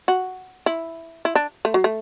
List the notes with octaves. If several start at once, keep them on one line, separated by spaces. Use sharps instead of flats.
F#4
E4
E4
D4
A3
F#3
A3